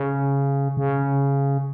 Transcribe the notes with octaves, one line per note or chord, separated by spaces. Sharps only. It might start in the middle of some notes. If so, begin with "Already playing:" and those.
Already playing: C#3
C#3